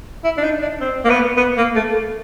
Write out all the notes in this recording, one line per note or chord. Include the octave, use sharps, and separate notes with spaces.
E4
D4
D#4
D4
C4
A#3
B3
B3
A#3
A3